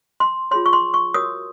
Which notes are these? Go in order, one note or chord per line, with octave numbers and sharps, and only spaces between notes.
C6
F4 G#4 C#5 C6
C#6
C6
C#6
F#4 A#4 C#5 D#6